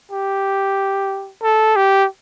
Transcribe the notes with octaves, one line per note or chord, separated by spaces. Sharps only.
G4
A4
G4